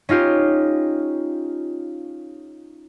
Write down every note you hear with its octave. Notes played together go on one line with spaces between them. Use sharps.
C#4 D#4 F4 G4